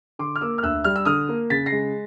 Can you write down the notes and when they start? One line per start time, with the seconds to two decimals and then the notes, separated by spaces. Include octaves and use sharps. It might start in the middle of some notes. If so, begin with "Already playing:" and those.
0.19 D3 C6 D6
0.36 F6
0.41 A#3 D6 E6
0.58 F6
0.63 D2 E6 F#6
0.84 G3 F6
0.96 E6
1.05 D3 D#6 F6
1.29 A#3
1.50 C#3 A6 B6
1.66 A#6 C7
1.72 G#3